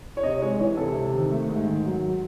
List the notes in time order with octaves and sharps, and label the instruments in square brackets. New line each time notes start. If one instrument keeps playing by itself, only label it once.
[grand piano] C#5
C3 D#5
G#3 C#5
E3 C#5
C3 A4
C3
D#3
A3
G#2
D#3
F#3